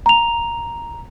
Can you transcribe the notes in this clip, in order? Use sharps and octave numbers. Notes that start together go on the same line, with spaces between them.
A#5 F7